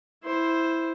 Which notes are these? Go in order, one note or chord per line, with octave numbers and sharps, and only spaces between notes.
E4 C5